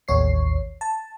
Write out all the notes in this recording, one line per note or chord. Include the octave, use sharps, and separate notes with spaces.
A1 D#2 C#5 C7
A5